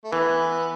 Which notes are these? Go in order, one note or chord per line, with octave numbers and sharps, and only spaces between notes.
A3
E3 B3